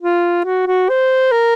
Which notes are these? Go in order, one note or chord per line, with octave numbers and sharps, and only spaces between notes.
F4
F#4
F#4
C5
A#4